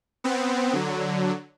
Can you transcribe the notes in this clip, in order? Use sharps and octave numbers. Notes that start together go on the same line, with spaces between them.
B3 C4
D3 F#3